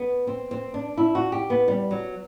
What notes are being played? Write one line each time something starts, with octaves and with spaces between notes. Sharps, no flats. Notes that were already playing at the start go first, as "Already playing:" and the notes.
Already playing: B3
C4
C4
D4
E4
F#4
G4
B3
G3
F#3